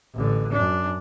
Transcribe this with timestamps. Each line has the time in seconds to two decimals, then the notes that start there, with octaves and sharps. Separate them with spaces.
0.14 A1 D3
0.52 F#2 D4